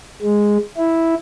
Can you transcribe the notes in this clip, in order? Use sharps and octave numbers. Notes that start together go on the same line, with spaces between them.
G#3
E4